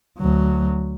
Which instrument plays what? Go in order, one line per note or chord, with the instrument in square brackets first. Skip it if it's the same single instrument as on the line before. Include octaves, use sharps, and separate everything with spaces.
[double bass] D2 F#3